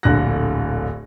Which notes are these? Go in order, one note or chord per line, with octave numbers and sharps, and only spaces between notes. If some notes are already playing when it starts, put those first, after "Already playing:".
D1 A#1 D3 F#6 A#6